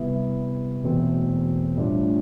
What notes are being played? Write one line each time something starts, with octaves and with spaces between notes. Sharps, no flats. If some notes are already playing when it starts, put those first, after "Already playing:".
Already playing: C3 G3 B3 E4
E1 E2 B2 A3 C4
A2 G3 D4 F4